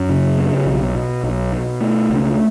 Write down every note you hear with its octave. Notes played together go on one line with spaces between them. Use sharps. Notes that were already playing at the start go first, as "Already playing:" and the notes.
Already playing: F#2
C#3
B3
B1
B2
B1
B2
A3
C#2